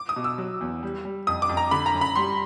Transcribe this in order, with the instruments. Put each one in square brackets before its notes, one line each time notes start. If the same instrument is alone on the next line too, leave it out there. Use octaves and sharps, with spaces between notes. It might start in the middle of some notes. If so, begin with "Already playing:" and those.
Already playing: [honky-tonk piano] D6
D#6
[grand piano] B2
[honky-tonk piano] E6
[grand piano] F#3
E2
G3
G3
[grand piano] F2 [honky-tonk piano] D#6
[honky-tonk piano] D6
[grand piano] F2
[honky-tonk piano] A#5
[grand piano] D3 [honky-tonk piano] B5
[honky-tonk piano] A#5
[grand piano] F#2
[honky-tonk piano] B5
[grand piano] G3 [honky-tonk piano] C6